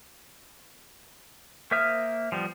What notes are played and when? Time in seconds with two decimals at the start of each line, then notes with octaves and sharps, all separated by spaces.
1.71 A#3 C5 E5 D#6 F6
2.32 F3 G3 B3